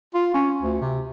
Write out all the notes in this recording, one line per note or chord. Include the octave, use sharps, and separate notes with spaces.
F4
C#4
D2
C3